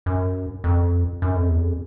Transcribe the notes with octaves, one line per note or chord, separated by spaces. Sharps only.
F#2
F2
F#2
F2
E2
F2